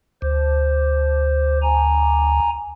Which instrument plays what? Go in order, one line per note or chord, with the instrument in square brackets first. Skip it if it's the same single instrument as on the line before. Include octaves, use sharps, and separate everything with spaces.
[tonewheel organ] D2 [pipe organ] C5
[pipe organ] G#5 A#5